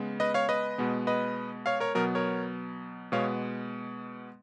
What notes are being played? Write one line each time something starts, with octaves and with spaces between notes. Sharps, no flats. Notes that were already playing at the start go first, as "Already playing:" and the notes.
Already playing: C#3 G#3 B3
B4 D#5
C#5 F5
B4 D#5
B2 G#3 B3
B4 D#5
C#5 F5
A#4 C#5
B2 F#3 B3 A#4
A#4 C#5
B2 G#3 B3 C#5 F5